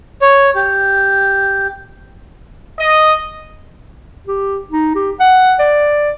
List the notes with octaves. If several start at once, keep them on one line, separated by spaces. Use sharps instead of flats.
C#5
G4
D#5
G4
D#4
G4
F#5
D5